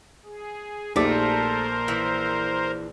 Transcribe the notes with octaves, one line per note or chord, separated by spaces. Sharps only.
G#4
A#1 A#2 A3 D#4 G4 A#4 C5 D5
E3